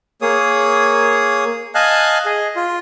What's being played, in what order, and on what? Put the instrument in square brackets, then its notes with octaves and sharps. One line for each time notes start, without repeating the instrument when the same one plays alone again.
[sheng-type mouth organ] A#3 G#4 C#5 D#6
D#5 F5 G#5 A5 F#6
G#4 D#5
F4